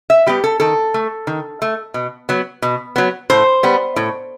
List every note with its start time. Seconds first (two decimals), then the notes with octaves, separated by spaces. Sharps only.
0.10 E5
0.26 G3 B3 G4
0.44 A4
0.60 D#3 A4
0.94 A3
1.27 D#3
1.62 A3
1.94 B2
2.29 F#3 B3
2.62 B2
2.96 F#3 B3
3.30 A2 C5
3.63 G3 B3
3.96 A2